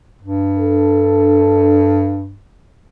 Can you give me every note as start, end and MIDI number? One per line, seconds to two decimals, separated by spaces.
0.22 2.39 43
0.58 2.15 62
0.58 2.15 69